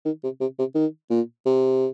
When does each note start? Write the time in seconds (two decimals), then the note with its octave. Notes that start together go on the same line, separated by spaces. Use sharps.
0.05 D#3
0.24 C3
0.41 C3
0.59 C3
0.75 D#3
1.10 A#2
1.46 C3